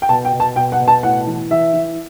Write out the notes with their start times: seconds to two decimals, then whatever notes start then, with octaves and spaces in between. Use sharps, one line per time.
0.02 G5
0.09 B2 A5
0.25 G5
0.33 B2
0.40 A5
0.56 B2 G5
0.72 F#5
0.80 B2
0.88 A5
1.03 A2 F#5
1.27 E3
1.51 E3 E5
1.74 E3